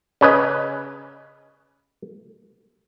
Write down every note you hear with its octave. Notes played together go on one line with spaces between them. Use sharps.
C#3 C#4 B4 D#5